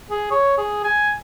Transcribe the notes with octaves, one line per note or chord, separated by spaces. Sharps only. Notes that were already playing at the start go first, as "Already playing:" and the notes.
G#4
C#5
G#4
G#5